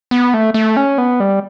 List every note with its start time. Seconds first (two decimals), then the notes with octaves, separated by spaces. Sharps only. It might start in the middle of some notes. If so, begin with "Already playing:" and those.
0.11 B3
0.34 A3
0.54 A3
0.76 C#4
0.98 B3
1.20 G3